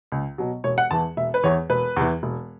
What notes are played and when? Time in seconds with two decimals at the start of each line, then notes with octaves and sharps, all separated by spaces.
0.12 C#2
0.38 B2 F#3
0.64 E1 C#5
0.78 F#5
0.91 E2 E3 A5
1.17 E1 E5
1.34 B4
1.43 E2 E3 C#5
1.70 E1 B4
1.97 E2 E3
2.23 E1